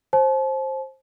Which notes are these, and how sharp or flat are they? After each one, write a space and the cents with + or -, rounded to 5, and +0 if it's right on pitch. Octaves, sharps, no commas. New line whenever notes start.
C5 +20 A5 -40